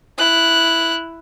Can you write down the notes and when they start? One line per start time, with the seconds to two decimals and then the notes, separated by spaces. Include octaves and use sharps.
0.18 E4 F#6